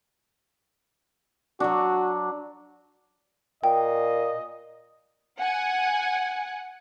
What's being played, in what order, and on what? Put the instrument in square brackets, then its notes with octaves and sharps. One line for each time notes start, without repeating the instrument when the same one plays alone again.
[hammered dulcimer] F#3 D4 [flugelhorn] F#4
[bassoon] A#2 [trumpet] D#5 [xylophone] G5
[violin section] F#5 G#5